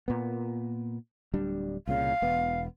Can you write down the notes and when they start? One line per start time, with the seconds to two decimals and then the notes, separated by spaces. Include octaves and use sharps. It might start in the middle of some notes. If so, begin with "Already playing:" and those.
0.08 A#2 B3
1.34 D1 G3 D4
1.87 C2 A#2 C#3 F5
2.22 E1 B3